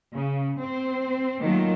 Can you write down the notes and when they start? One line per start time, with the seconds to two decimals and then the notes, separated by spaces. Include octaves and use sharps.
0.15 C#3
0.60 C4 C5
1.41 D#3 F#3 A3 A#3 F4